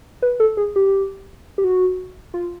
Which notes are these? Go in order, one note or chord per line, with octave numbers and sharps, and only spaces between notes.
B4
A4
G#4
G4
G4
F#4
F4